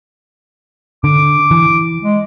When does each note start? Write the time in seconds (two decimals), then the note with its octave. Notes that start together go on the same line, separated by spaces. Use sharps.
1.04 D3 D6
1.51 E3
2.02 G#3